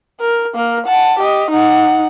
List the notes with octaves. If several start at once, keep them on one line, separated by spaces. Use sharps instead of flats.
A#4
A#3 A#4
F#5 A5
G4 D#5
D#4 F#5